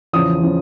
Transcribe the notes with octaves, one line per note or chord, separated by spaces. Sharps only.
E2 C#3 F3 D#6
C#3 F3